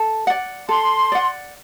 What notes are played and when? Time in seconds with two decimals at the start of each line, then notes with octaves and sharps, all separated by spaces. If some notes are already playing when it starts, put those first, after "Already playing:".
Already playing: A4
0.27 D5 F#5
0.69 A4 C6
1.12 D5 F#5